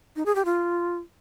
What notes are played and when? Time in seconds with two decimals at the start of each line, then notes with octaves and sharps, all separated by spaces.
0.16 D#4
0.26 G#4
0.35 G4
0.45 F4